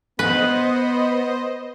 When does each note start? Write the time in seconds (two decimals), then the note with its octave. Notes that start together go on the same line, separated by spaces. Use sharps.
0.19 B3 B4 C5 D#5